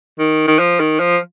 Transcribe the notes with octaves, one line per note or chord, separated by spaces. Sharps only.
D#3
D#3
F3
D#3
F3